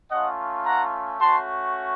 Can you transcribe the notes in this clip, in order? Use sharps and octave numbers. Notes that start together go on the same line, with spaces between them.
A3 C#4 F4 D#5 F#5
F#5 A#5
A3 C#4 F#4 A5 C6